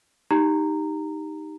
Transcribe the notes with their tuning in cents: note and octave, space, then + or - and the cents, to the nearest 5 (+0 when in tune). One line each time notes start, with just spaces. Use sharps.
D#4 +0 G4 +0 A#5 -15